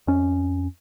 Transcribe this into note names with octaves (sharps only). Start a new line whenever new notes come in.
F2 C#4